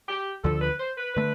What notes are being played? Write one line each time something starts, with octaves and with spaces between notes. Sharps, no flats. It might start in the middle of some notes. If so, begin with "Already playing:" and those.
G4
D2 D3 F3 A4
B4
C5
B4
D3 A3 B4